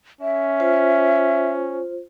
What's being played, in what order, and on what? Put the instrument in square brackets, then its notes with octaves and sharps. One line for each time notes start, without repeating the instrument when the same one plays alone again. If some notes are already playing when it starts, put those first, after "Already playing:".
[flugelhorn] C#4 [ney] E5
[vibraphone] F4 C5